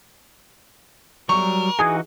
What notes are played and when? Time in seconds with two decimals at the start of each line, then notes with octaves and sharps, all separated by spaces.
1.29 F#3 G3 A#4 C#6
1.79 E3 D#4 F#4 G#4